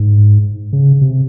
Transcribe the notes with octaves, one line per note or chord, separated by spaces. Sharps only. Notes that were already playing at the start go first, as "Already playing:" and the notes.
Already playing: G#2
C#3
C3